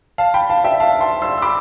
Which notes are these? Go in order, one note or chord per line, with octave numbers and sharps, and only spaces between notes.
F5 A5
G5 B5
F5 A5
E5 G5
F5 A5
A5 C6
C6 E6
E6
B5 D6